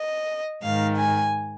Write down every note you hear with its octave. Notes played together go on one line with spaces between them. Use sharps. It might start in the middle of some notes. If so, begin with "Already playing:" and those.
Already playing: D#5
G#2 D#3 F5
G#5